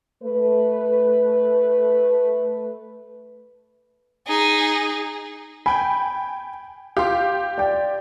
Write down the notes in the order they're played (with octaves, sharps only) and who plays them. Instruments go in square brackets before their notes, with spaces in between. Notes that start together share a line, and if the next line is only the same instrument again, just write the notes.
[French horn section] A3 B4
[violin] D#4 G#4
[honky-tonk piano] G5 G#5 [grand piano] B5
[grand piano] F4 C6 [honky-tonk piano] G4
[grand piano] D5 G5